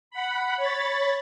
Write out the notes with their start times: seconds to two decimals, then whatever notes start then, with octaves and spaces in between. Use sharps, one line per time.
0.11 F#5 B5
0.57 C#5 B5 A6